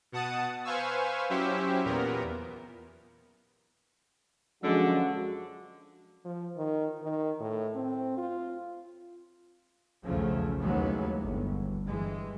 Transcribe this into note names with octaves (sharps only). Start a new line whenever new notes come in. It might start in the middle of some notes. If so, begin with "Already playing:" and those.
B2 F#5 A5 D#6
B4 C5 F5 G#5 C#6 E6
F#3 C#4 E4 G4 C5 E5
E2 A#2 B3 A#4
F#2 D3 F3 G#3 F#4
F3
D#3
D#3
A2
C4
F4
B1 E2 C#3 F3 A3
D#2 E3 F#3 G#3 A3 B3
G1
G2 E3 G#3